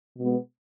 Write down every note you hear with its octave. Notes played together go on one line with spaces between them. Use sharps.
B2 G#3 B3